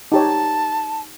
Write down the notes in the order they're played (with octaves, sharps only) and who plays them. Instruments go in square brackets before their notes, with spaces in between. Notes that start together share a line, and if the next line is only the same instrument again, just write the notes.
[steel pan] D#4 G4 C#5 [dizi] A5